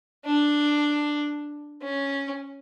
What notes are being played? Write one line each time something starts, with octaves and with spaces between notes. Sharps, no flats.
D4
C#4